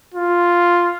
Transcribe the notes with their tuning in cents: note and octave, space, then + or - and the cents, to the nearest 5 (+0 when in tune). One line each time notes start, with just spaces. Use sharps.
F4 +0